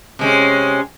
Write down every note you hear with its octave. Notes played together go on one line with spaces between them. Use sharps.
C3 G#3 C#4